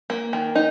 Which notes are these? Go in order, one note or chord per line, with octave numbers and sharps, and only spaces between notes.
A#3
D#3
D#4